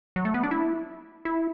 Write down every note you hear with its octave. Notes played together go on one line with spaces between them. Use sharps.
F#3
A3
B3
D4
E4
E4